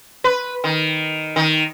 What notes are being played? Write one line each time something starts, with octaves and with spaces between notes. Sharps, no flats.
B4
D#3
D#3